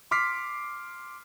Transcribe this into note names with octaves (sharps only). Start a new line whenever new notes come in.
C6 D6 F6 B6 C7